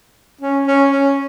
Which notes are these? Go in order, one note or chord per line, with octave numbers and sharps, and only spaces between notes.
C#4
C#4
C#4